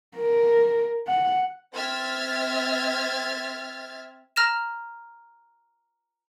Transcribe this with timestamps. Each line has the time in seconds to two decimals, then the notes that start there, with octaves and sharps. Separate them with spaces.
0.16 A#4
1.07 F#5
1.75 C4 E5 F6 G#6 A6
4.36 A#5 F6 A#6 E7